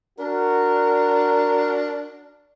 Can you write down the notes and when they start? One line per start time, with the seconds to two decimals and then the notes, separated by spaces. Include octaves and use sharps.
0.19 D4 F#4 A#4